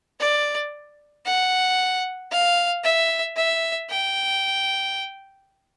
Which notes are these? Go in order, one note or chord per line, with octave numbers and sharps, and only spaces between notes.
D5
F#5
F5
E5
E5
G5